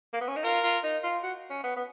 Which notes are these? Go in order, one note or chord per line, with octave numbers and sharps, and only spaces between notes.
A#3
B3
C#4
D#4
F4 A#4
F4
D#4
F4
F#4
C#4
B3
B3